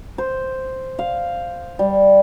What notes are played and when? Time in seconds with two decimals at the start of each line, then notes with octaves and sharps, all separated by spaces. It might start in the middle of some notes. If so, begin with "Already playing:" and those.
0.18 C5
0.99 F5
1.79 G3